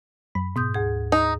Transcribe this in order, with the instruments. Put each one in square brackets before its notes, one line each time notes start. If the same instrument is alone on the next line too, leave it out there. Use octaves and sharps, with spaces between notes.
[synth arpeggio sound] F#2 B5
[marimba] G#2 D#6 G6 [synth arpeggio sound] B2
[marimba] D2 G#4
[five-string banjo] D#4